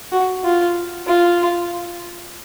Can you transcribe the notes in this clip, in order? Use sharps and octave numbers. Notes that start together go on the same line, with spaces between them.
F#4
F4
F4